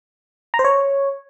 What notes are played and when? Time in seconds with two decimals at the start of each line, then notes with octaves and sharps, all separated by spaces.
0.54 A#5
0.59 C5
0.65 C#5